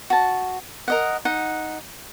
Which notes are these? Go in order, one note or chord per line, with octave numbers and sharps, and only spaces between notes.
F#4 A5
A#4 D#5 F#5
D#4 F#5